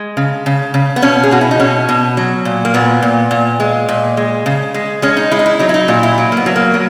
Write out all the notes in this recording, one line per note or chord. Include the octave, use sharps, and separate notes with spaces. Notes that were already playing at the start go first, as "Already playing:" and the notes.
Already playing: G#3
C#3
C#3
C#3
B3
B2 C#4
G#4
B2 F#4
E4
D#4
B2 C#4
B2
F#3
A#2
A#3
A#2 B3
A#2
A#2
G#3
A#2
G#3
C#3
G#3
G#3 C#4
D#4
G#3 E4
D#4
E4
F#3 D#4
E4
D#4
A#2 E4
E4
F#3
A#3
B3
F#3
A#3
F#3